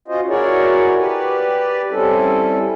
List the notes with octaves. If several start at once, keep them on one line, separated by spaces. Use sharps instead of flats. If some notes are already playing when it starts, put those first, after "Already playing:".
C#4 F4 F#4 C5 D#5
E4 F#4 G#4 A#4 C#5 D5
G4 B4 D5
G3 C4 C#4 E4 A4